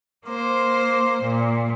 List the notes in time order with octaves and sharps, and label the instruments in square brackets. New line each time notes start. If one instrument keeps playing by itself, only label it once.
[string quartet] A#3 C5 [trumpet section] A#4 C6 D6
[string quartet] A#2